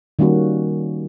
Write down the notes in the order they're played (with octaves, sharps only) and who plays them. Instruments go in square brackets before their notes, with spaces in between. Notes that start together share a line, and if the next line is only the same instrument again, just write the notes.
[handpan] D#3 G3 A#3 C#4 F#4